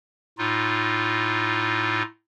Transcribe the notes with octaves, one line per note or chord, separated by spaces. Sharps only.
A2 D#4 F4